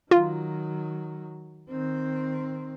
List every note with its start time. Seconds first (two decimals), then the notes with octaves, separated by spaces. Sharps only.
0.11 D#3 F#3 F4
1.70 D#3 C4